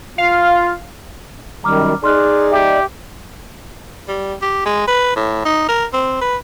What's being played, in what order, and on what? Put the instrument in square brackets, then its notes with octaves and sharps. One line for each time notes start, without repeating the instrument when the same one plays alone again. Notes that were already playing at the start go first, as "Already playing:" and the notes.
[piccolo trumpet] F4 [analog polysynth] F5
[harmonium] F#2 D#3 G3 [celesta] A#5 D6 F6
[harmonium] D#4 D5 [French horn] G#4 [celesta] C6 F6 F#6
[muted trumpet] G4 [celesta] E5
[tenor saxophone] G3
G4
G#3
B4
A2
D#4
A#4
C4
B4